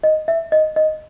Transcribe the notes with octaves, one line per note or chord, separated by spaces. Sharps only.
D#5
E5
D#5
D#5